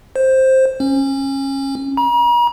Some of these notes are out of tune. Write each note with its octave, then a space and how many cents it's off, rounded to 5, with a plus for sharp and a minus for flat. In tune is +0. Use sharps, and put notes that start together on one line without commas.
C5 +10
C#4 -25
A#5 +45